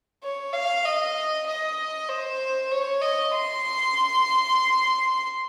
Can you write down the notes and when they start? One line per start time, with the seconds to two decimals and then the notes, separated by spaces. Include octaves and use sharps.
0.23 C#5
0.53 F5
0.85 D#5
1.46 D#5
2.09 C5
2.71 C#5
3.02 D#5
3.32 C6